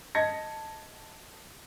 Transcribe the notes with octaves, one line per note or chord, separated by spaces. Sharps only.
D#5 A5 G#6 A#6 C#7